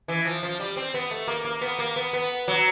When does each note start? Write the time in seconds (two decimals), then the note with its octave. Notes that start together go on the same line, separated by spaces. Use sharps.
0.08 E3
0.25 F3
0.43 F3
0.60 G3
0.77 C4
0.94 B3
1.11 A3
1.28 A#3
1.45 A#3
1.61 B3
1.79 A#3
1.96 B3
2.13 B3
2.48 F#3